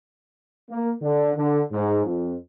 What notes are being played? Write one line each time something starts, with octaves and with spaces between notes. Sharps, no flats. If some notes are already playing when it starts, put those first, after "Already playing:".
A#3
D3
D3
G#2
F2